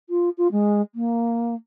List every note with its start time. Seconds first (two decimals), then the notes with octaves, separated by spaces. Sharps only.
0.09 F4
0.38 F4
0.52 G#3
0.95 A#3